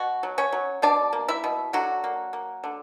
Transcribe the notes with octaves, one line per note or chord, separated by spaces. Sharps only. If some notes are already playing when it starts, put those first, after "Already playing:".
Already playing: B2 F#4
F#3
C#4 C#5
F#3
B2 D4 D5
A#3
E4 E5
B2
D3 F#3 F#4
A#3
A#3
D3